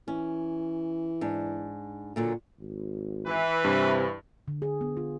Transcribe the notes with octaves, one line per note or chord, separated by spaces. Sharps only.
E3 C#4
G#2 D4
A#2 D3 F#3
G#1
E3 B4
G2 C3
D3
G#4
B3
F4